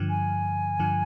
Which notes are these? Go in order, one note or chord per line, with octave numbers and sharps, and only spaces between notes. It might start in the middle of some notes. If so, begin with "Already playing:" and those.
Already playing: G2 D3 F3
G#5
G2 D3 F3